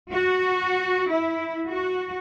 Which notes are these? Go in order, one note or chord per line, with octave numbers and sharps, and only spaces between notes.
F#4
E4
F#4